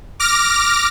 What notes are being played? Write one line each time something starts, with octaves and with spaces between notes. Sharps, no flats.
D6 F6 A#6